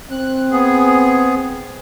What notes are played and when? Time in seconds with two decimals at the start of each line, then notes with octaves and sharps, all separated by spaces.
0.11 C4 F#6
0.51 B3 G#4